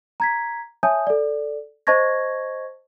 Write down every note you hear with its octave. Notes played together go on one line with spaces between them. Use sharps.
A#5 G#6 B6
C#5 E5 G#5 A5 D#6 G6
A4 D5
C5 D#5 A5 C#6 G#6 A#6